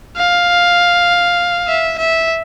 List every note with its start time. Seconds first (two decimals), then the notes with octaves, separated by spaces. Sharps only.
0.16 F5
1.67 E5
1.98 E5